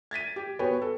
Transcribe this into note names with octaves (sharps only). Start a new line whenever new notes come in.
G#6 A6 B6 D#7
G4
B3 F#4 B4 C#5 G5 G#5
A4